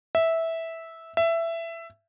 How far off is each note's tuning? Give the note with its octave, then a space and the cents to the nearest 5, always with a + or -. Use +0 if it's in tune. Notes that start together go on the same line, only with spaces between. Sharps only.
E5 -10
E5 +15